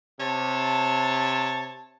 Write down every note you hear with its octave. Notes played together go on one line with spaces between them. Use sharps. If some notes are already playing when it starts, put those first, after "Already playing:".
C3 C#5 A5